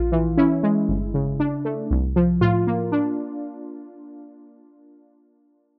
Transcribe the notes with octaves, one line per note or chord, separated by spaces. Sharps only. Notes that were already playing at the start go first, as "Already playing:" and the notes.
Already playing: A#1 F4
E3
C#4 E4
G#3
G1
C#3
D4
A3
C2
F3
A2 F4
A#3
D4